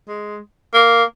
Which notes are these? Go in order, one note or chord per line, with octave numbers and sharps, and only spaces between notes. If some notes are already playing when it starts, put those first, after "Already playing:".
G#3
A#3